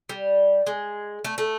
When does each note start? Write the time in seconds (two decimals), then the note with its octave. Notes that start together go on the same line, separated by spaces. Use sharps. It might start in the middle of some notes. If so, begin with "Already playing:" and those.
0.09 G3
0.67 G#3
1.24 A3
1.38 A3